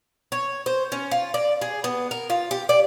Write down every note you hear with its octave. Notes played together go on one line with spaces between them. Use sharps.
C#5
C5
C#4
F4
D5
G#4
B3
A#4
F4
G4
D5